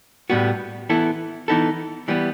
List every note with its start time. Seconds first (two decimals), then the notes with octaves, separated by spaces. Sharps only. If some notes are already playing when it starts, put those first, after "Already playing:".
0.30 A2 G3 B3 F#4
0.89 E3 B3 E4 A4
1.48 E3 B3 D#4 A4
2.08 E3 G3 B3